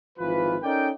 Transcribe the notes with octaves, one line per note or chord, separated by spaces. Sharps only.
G#1 E3 F3 F4 B4
C#4 D#4 A4 A#4 D5 G5